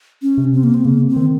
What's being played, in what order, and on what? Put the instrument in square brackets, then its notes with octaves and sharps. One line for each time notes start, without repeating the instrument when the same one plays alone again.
[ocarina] C#4
[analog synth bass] C3
[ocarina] C4
A#3
C4
[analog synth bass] C#3 [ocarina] A#3
[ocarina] C4
[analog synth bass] D#3